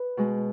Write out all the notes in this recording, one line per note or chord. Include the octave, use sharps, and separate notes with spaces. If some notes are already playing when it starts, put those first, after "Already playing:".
Already playing: B4
B2 G#3